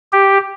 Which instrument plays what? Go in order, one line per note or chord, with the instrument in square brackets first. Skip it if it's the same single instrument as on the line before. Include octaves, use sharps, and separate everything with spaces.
[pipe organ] G4